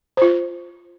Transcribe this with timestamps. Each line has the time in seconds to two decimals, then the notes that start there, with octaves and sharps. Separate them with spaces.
0.17 F4 C5